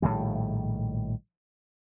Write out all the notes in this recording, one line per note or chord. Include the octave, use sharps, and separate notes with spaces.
A#1 A2 D#3 G3